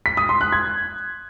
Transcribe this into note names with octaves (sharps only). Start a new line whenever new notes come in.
B6
D#6
C6
F#6
G#6